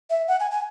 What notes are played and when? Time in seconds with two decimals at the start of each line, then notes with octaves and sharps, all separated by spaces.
0.10 E5
0.28 F#5
0.40 G#5
0.51 G#5